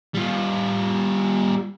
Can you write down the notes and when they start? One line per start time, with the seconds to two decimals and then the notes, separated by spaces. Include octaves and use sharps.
0.15 G3 F4